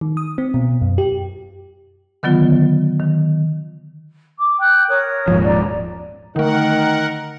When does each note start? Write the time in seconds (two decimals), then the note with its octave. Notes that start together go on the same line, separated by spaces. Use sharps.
0.01 D#3
0.17 D#6
0.38 C4
0.54 B2
0.81 F#2
0.98 G4
2.23 D3 D#3 F#3 B3 F4
3.00 D#3
4.39 D6
4.58 G5 F#6
4.89 A#4 C#5 D#6
5.28 D#1 G#2 F3
5.44 D5 A#5
6.36 D3 D#3 A3 A#4 F#5